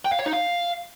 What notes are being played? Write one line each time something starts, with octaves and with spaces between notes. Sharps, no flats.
G5
F5
C#5
D#4
F5